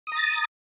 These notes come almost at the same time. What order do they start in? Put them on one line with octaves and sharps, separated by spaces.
D#6 A#5 A6